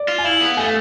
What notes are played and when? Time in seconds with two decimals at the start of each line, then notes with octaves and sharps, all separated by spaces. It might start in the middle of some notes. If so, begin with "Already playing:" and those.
Already playing: D5
0.08 F4
0.18 G#5
0.24 E4 F5
0.41 B3
0.57 A3 G#5
0.66 F5